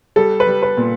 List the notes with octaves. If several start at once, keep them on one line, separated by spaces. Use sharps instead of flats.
G3 A4
B4
G3
B4
A#2